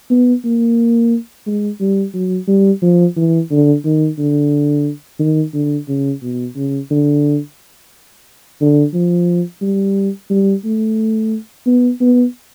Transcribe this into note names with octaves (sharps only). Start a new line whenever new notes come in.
B3
A#3
G#3
G3
F#3
G3
F3
E3
D3
D#3
D3
D#3
D3
C#3
B2
C#3
D3
D3
F3
G3
G3
A3
B3
B3